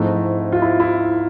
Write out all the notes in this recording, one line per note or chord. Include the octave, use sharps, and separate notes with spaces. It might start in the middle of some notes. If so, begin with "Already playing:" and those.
Already playing: G#2 F3 A3 C4 E4
F4
E4
E4